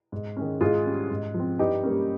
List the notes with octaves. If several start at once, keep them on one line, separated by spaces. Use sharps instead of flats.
G#2
D#3 G#3 C#4
G#2 F4 G#4
G3 C#4
G#2
F3
C4
G2 D#4 G4
G3 A#3 C#4